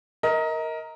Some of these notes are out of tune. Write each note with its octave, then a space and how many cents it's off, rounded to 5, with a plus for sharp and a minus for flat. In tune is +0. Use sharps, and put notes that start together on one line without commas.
A#4 +0 D#5 +30